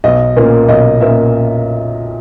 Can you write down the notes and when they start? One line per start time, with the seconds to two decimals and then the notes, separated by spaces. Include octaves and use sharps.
0.04 B1 D#5
0.36 A#2 A#3 C#4
0.68 B1 D#5
1.01 A#2 A#3 C#4 E5